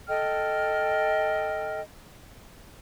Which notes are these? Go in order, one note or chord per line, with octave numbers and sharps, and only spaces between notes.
A4 D#5 G5 F6